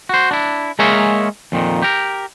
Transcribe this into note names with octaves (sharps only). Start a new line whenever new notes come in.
F#4 C5
D4 E4
G#3 A#3 G#4 A#4 C#5 E5
F2 A#2 D#3
G4 A#4